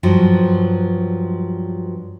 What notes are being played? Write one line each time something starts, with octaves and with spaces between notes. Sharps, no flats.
G2 F3 F#3